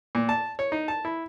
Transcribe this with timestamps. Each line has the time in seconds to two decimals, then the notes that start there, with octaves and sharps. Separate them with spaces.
0.15 A#2
0.29 A5
0.59 C#5
0.72 D#4
0.88 A5
1.05 E4